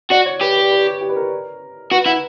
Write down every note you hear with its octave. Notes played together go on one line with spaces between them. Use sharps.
F#4 D5
C#5
G4 B4
B4
B4
G4
G4
B4
A#4
F#4 B4
E4 F#5